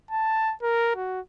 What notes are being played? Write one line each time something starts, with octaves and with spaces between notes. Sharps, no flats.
A5
A#4
F#4